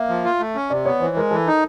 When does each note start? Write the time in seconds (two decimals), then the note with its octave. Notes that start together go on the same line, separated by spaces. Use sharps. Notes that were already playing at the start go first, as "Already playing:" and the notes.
Already playing: A#3 E5
0.09 F3
0.25 F4
0.40 A3
0.55 C#4
0.70 C3 D5
0.85 B3 C#5
1.00 E3 C5
1.16 G#3 A#4
1.31 E3 A4
1.47 D#4